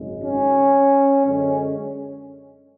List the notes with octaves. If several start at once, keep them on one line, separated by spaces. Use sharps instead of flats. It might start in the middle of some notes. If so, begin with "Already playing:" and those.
Already playing: G#1 F#2 C#3 G#3
C#4
F#2 D3 G#3 C#4